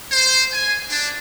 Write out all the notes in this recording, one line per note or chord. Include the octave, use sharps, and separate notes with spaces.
C5
G#5
D4